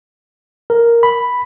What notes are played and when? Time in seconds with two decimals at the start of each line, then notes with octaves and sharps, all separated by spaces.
0.70 A#4
1.03 B5